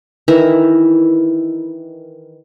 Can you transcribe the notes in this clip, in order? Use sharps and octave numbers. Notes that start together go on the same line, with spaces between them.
D#3 E3 E4 A#5